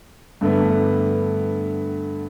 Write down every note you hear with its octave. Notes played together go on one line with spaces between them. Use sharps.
G2 D3 A3 B3